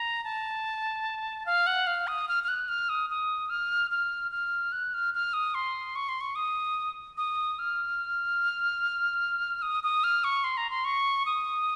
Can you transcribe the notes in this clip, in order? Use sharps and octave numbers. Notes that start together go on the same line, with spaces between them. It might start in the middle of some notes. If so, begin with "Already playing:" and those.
Already playing: A#5
A5
F5
F#5
F5
D#6
F6
F6
F#6
F6
D#6
D#6
F6
F6
F6
F#6
F6
F6
D#6
C6
C#6
C6
C#6
D#6
D#6
F6
D#6
D#6
F6
C#6
C6
A#5
C6
C#6
D#6